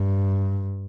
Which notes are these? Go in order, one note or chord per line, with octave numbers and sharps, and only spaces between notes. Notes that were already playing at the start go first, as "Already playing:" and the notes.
Already playing: G2